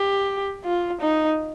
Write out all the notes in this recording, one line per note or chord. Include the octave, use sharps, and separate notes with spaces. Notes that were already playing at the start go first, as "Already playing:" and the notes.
Already playing: G4
F4
D#4